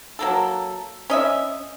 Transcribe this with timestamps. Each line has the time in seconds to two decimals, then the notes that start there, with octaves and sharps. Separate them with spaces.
0.19 F#3 A#3 A4
1.10 C#4 D#5 E5